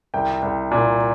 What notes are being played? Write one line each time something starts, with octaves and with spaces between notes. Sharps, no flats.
C2 G5
C2
A#2